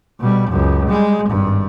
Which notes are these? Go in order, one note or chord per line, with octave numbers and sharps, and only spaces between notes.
B2 G3
C#2 F#2
G3 G#3
G#1 G2